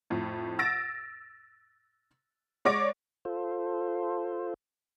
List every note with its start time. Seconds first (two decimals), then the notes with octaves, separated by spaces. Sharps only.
0.10 F2 A2
0.59 E6 A6 A#6 D7
2.65 G#3 C#5 D5 D6 A#6 D7
3.25 F4 A4 C5